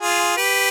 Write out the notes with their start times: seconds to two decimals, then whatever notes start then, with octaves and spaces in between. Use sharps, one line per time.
0.01 F4 G#4
0.37 G4 B4